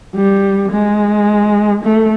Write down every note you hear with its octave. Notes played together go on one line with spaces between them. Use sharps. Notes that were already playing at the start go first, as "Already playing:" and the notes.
G3
G#3
A3